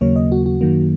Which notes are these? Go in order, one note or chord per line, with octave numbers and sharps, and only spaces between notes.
D#2 C#3 F#3 A#3 C#5
D#5
F#4
F#4
F#2 D#3 F#3 A#3